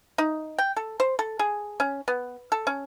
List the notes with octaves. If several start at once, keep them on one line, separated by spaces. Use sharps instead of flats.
D#4
G5
A4
C5
A4
G#4
C#4
B3
A4
C#4